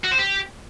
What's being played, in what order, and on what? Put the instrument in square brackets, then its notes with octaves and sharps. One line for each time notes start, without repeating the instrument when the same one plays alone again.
[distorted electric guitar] F#4
C5
G4